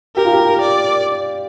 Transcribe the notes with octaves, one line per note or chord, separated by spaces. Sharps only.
G4 A#4
F4
G4
D5